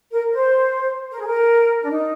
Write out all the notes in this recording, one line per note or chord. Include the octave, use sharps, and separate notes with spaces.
A#4
C5
A#4
G#4
A#4
D4
D#4